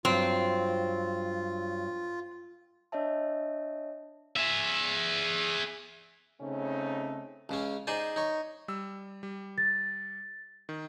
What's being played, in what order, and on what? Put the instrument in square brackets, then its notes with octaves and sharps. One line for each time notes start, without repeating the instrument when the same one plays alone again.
[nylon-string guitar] G2 F#3 [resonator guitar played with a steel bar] C4 [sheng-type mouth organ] F4
[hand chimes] D4 C#5 D#5 E5 A5
[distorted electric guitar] G#4 E5
[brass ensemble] C#3 A3 C4 C#4 D#4
[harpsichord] C#2 C#3 C#4
D#4 G#4 C5 D5 G#5
D#4 C#5
[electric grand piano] G3 E6
G3
[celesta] A6
[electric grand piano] D#3